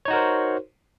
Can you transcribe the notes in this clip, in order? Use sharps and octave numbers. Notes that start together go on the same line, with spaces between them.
D#4 F#4 A#4 C5 C#5